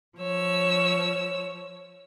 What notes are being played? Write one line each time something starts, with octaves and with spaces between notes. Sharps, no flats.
F3 C#5 E6